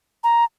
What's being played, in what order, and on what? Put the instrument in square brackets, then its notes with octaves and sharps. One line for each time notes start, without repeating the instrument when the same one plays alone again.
[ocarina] A#5